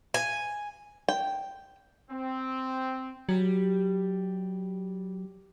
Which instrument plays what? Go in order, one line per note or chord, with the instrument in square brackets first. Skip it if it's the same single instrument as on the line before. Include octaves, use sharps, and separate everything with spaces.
[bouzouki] G#5
[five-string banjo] G5
[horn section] C4
[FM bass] F#3 [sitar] G3